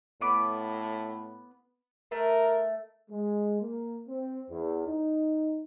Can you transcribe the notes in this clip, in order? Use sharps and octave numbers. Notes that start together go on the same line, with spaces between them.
A2 B3 B5 D6
A3 A#4
G#3
A#3
C4
E2
D#4